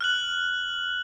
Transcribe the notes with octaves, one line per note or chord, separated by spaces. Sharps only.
F6 F#6 F#7